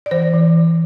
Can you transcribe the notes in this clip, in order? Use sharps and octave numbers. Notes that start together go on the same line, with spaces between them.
D5
E3 C5
E3